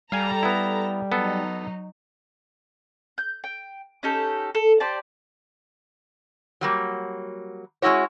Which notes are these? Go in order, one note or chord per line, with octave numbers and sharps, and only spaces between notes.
G3 A4 F5 G#5 A#5
B3 E4
F#3 B3 D#4 A4
G6
G5
C#4 D#4 G4 A4
A4
G4 C5 D5 A5
F#3 G3 A#3
G#3 C#4 E4 F#4 C#5